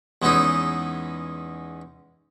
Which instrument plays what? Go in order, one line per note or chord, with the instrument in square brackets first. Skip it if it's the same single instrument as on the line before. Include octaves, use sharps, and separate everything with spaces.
[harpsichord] E2 G#3 B3 C#4 D#4 E4